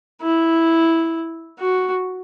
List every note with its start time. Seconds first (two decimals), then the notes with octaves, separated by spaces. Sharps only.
0.22 E4
1.59 F#4